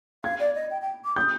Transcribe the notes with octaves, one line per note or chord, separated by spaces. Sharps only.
F5 G#6
D5
D#5
G5
G5
D6
D#6 G6